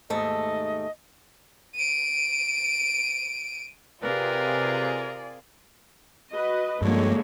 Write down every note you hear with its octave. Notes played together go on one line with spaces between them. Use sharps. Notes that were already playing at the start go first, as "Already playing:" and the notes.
D#2 G#2 A3 D#5
D7 D#7
C3 F4 G#4 A#4 B4 D5
F#4 B4 D#5
G2 D3 F3 G#3 A#3 G4 C#5